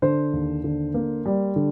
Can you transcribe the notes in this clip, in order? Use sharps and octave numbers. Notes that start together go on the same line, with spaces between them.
D3 C5
D#2
D3
A#3
G3
D3